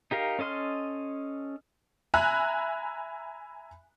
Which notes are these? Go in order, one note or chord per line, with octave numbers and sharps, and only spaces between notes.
D#4 G4 A#4 F5
C#4 A4 D#5 C6 F6
E5 G#5 A#5 B5 F#6